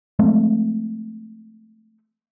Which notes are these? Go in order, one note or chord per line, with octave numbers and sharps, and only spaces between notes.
F3 G#3 A3 C4